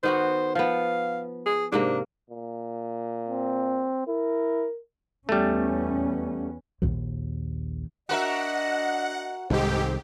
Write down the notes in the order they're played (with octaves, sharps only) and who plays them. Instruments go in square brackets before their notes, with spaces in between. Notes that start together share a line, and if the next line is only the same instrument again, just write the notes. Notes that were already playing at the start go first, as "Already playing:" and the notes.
[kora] D#3 B3 F#4 [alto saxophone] C5
[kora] F3 B3 [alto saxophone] F5
[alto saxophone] G#4
[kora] G#2 C3 A#3 [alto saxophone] D4
[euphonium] A#2
[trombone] C4
[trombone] E4 [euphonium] A#4
[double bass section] E2 B3 C#4 [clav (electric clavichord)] G3 A3
[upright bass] A#1 D#2
[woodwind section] D4 D#5 [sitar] F#4 A#4 E5 [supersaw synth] F#5
[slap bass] C2 D#3 [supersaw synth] G#2 G4 [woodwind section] D#4 A4 C5